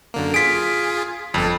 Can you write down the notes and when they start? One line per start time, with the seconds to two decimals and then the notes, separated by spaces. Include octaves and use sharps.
0.14 F#2 D3 A#3
0.34 F4 G#4 B6 D7
1.34 G1 F2 A4